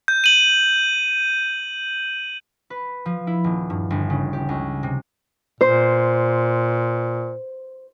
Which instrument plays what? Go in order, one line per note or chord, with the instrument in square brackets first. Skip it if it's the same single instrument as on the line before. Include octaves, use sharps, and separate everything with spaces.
[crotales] G6
D#7 F#7
[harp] B4
F3
E4
D#1
G2
G1
C#3
G4
C#2
C3
[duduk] A#2 [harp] C5